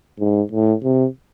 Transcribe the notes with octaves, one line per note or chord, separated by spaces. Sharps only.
G#2
A2
C3